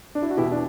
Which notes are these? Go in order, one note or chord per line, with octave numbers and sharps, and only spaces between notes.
D4
E4
F#4
E2 B2 E4 G4
D4